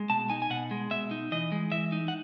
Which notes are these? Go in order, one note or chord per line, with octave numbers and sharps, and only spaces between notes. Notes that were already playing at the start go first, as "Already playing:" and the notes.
Already playing: G#3
B2 A5
D#4 G#5
G#5
B2 F#5
G#3
B2 E5
D#4
E3 D#5
G#3
E3 E5
D#4
F#5